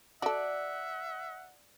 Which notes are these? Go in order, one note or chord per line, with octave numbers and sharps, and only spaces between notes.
F#4 A4 D5 E5 F#5